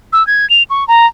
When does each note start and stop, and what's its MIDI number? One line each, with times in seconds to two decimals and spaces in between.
0.13 0.26 88
0.27 0.48 92
0.50 0.63 101
0.70 0.86 85
0.88 1.07 82